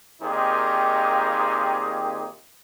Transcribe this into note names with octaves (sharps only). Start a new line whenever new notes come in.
A#2 D#3 C4 D#4 G4 G#4